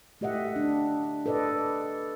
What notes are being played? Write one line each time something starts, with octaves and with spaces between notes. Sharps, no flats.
A3 G4 D#5 E5 F#5
D4
A4 B4 D5 D#5